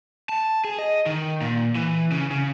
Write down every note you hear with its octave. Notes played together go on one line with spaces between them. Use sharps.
A5
G#4
D#5
D#3
A#2
E3
C#3
C#3